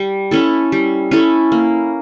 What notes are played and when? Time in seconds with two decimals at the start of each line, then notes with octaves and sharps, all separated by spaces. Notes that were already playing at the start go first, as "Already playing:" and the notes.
Already playing: G3
0.31 C#4 E4 A4
0.72 G3
1.11 C#4 E4 A4
1.52 A#3